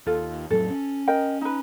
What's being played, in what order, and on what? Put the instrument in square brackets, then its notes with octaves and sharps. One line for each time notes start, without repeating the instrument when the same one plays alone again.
[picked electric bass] D#2 [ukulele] F4 A4
[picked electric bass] F2 A2 F#3 [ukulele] A4
[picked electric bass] C#4
[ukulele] A#4 D#5 G5
D#4 B4